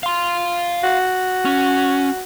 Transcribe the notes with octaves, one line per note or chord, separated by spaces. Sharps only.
F5 C6
F#4
C#4